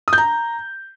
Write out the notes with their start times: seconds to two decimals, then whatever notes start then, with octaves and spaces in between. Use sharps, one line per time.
0.08 D#6
0.13 G6
0.18 A#5